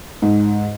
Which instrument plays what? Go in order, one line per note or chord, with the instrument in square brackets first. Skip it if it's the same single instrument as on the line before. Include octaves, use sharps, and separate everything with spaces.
[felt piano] G#2